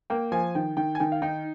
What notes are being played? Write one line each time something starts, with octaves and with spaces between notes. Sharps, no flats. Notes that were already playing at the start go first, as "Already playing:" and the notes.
A#3 G5
F3 G#5
D#3 G5
D#3 G5
G#5
D#3 G5
F5
D#4 G5